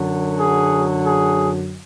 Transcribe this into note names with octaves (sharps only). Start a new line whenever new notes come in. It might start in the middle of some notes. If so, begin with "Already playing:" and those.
Already playing: F#2 D3 F#3
G#4
G#4